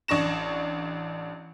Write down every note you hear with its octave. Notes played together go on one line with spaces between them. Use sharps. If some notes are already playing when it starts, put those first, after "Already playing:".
A1 D4 C#6 A#6 E7